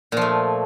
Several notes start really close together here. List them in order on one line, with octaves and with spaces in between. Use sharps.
A#2 F3 A3